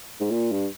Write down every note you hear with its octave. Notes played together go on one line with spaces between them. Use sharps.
G#2
A#2
G2